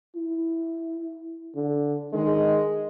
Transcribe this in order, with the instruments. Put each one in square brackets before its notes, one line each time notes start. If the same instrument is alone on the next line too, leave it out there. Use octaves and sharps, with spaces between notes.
[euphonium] E4
D3
[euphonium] D#3 [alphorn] G#3